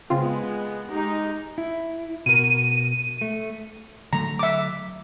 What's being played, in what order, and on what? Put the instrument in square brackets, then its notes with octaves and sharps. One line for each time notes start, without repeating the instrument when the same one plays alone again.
[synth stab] C#3 C4 F4 [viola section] G#3 B3
[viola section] G#3 D#4 G4
[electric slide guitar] E4
[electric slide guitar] B2 A#4 [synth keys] D#7
[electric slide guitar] A3
[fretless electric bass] D3 F#3 A3 [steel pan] A#5
[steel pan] E5 D6